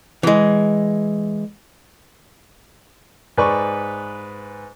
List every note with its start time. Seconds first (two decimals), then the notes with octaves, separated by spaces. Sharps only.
0.23 E3 G#3
3.38 G#2 B4 D5 C#6